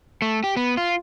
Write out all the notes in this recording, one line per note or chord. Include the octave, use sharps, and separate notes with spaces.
A3
G4
B3
F4